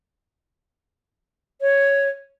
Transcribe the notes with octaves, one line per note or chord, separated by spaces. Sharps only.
C#5